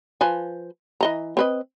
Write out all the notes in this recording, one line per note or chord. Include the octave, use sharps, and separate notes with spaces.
F3 B4 G#5
E3 D#5 A#5
C4 B4 D#5